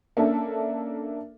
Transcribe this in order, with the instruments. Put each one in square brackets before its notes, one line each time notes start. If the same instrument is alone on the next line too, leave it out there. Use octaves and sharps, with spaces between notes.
[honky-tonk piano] A#3 C#4 D4 A4 E5